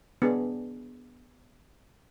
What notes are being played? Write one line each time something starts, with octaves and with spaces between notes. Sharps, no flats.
B3 D4 G#4